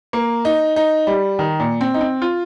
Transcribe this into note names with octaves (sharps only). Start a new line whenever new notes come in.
A#3
D#4
D#4
G3
D#3
A#2
C4
D#4
C4
F4